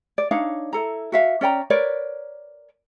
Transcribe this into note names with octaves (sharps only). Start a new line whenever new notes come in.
D5
D4 D#4 C#5 F5
E4 A4 A#5
F#4 E5 F5
C#4 D5 G5 A#5
A#4 B4 C#5 D5